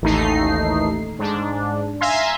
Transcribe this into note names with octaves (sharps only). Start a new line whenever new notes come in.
A1 D#2 A3 D#4 C7
G#2 D4
E5 F5 G#5 A#5 C6